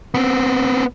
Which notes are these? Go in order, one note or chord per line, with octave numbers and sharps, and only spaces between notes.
B3 C4